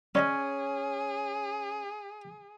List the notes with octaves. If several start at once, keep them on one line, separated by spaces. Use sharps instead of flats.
C#4 G#4 D5 D#5 G#5